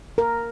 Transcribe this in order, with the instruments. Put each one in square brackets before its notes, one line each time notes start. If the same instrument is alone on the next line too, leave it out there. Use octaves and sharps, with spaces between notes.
[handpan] A#4